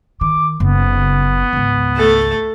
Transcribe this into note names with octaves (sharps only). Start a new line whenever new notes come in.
D#3 D6
F#1 C#3 B3
G#1 C#2
A3 A4